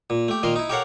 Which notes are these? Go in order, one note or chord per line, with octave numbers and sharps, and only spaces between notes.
A#2
A3 G4
A#2 D#3 A#4 C6
D#4 E4
G4 A4 A#4 C#5 F5 F#5